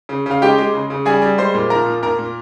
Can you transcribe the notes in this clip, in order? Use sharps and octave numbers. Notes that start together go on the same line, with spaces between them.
C#3
C#3 F5
G#3 G4 G5
G#3
C#3
C#3
G3 G#4 G#5
G3
G#3 C5 C6
A#2
F3 A#4 A#5
A#2
A#2 A#4 A#5
A#2